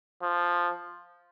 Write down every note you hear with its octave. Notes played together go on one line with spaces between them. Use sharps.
F3